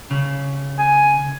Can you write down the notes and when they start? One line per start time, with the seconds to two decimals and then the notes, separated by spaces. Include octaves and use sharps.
0.11 C#3
0.79 G#5